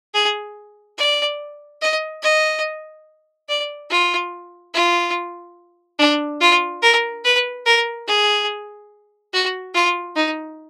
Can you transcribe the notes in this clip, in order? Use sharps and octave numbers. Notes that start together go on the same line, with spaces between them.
G#4
D5
D#5
D#5
D5
F4
F4
D4
F4
A#4
B4
A#4
G#4
F#4
F4
D#4